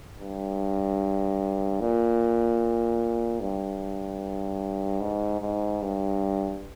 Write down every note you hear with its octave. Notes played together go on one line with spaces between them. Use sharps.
G2
A#2
G2
G#2
G#2
G2